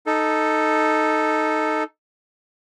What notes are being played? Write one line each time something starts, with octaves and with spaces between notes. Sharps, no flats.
D#4 A4